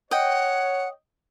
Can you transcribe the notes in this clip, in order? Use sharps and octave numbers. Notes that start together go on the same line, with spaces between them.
C#5 D#5 F#5 G5